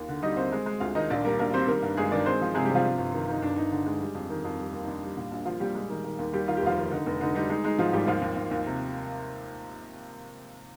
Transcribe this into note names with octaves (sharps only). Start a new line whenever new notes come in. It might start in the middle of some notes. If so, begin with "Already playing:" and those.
Already playing: D#2 F4
D3
G3 D#4 D#5
D#2 C4 C5
G#3
G#3
D2 F4 F5
D#3 D#4 D#5
A#1 D4 D5
G3 A#3 A#4
A#1 A#3 A#4
G3 C4 C5
D#3 A#3 A#4
G2
G1 G#3 G#4
D#3 D4 D5
G#3 C4 C5
F3
C3 G#3 G#4
G3 G4
C3 F3 F4
G1
G1
D#3
D#3 D#4
G1 D4
G1 D#4
D3 D4
G#3
G3
F2
D#3
F2
G3
D#2
D#4
D#2 D4
G3
A#2
A#1
F3 F4
A#2 G3 G4
G#3
D#3
D#3
D#2
D#2 G3 G4
D#3 F4
G4
F1 F3 F4
D#3
D3 D#4
F1
D3 D#4
G3 D#4
G#3 D#4
G#3 D#4
G#2 F3 F4
G#1 G3 G4
D#2 F3 F4
D#2
D#2
D#2
C3